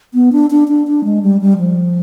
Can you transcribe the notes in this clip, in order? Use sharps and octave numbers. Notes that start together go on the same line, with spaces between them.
B3
D4
D4
D4
D4
G#3
G3
G3
F3